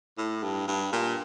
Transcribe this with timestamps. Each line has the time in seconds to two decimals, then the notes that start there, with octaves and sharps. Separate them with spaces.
0.18 A2
0.43 G2
0.68 G2
0.92 A#2